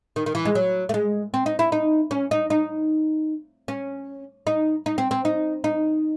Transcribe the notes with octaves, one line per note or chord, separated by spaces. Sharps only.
D#3
D#3
E3
G#3
F#3
A3
G#3
C4
D#4
E4
D#4
C#4
D#4
D#4
C#4
D#4
D#4
C4
C4
D#4
D#4